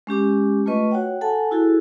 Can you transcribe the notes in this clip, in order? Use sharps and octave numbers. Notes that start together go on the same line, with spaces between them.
G#3 C#4 G4 D6
A3 F4 B4 D#5 C#6
F#4 C#5 F#5 G5
A4 F#5 G#5 A5
E4 F#4 G#4 A4